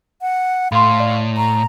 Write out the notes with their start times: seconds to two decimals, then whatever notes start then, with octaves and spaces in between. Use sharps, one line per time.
0.21 F#5
0.72 A2 F5 B5 C6
1.00 D5
1.37 A#5